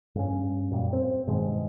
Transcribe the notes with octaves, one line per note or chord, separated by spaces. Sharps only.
G2 C#4
F#2 A#2 G3
C4
G2 B2 D#3 G#3